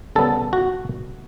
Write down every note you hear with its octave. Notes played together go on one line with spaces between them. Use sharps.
C#3 G3 B3 A4
F#4